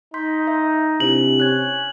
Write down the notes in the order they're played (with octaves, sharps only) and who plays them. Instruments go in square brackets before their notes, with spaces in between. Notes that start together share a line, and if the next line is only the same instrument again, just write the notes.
[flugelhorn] D#4 [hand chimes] C6 G6 B6
[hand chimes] E5
[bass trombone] C3 [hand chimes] D4 E4 C5 [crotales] F#7
[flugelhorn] C#4 [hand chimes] F#6 G#6